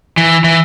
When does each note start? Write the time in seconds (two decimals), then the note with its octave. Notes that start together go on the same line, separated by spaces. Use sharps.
0.17 E3
0.44 E3